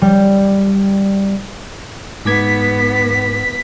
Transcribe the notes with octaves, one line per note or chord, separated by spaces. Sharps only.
G3
G#2 B3 D6 G#6 B6